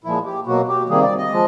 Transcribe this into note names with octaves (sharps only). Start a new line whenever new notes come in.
A#2 F3 G#3 E4
G4
B2 F#3 A#3 F#4
G4
C3 D#3 G3 A#3 G#4
D5
D#5
F3 G#3